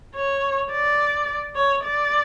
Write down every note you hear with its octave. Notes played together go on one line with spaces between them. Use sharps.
C#5
D5
C#5
D5